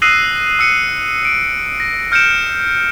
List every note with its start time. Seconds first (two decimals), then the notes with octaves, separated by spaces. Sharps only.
0.02 D#6 E6 F#6 A#6 C7 D#7
0.59 E6 C#7 D#7
1.25 D7
1.80 A#6
2.12 F6 G6 C#7 D7 E7